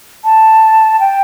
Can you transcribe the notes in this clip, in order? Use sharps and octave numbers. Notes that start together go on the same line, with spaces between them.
A5
G5